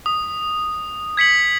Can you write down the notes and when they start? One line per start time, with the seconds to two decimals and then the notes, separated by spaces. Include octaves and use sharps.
0.06 D#6
1.17 G#6 B6 C#7 F#7